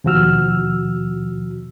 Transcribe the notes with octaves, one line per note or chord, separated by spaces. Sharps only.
D#2 B2 F3 F#4 E6 F6